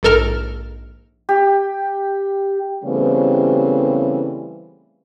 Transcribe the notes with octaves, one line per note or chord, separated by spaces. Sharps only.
A#1 G#2 A4 A#4 F6
G4
C#3 E3 G3 A3 B3 C4